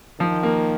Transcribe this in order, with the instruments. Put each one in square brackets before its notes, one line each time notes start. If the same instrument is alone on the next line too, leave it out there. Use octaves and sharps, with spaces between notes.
[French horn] D#3 [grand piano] F3
[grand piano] A#3